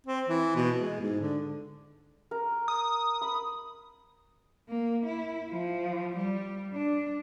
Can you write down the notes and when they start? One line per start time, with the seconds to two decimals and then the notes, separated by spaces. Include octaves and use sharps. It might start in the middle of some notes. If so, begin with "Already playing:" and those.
0.07 C4
0.28 E3
0.56 B2
0.79 G#3
1.00 G#2
1.20 D3
2.31 A#4
2.68 D#6
3.21 B5
4.69 A#3
5.06 E4
5.51 F3
6.16 G3
6.73 D4